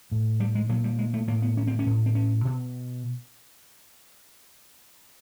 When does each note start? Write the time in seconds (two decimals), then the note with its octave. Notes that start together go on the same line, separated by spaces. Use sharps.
0.11 A2
0.40 G3
0.55 G#3
0.69 A#2 F#3
0.84 G3
0.99 G#3
1.14 A3
1.27 A2 A#3
1.42 B3
1.57 C#4
1.67 C4
1.79 C#4
1.86 A2
2.06 C4
2.15 C#4
2.45 B2